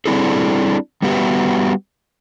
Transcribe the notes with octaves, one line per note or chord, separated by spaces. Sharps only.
G3 C4 D4 E4 G#4 A4
G3 B3 F#4 G4 B4 E5